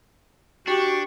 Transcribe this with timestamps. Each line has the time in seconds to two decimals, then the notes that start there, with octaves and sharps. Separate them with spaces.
0.67 D4 F#4 G4 C#6